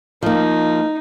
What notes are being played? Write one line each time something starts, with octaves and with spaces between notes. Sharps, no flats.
F3 A#3 D#4